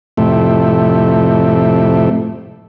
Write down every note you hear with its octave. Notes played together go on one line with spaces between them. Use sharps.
F2 A2 C3 A3